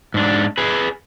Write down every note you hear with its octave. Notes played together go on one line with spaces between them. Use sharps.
G#2 D4
G#4 B4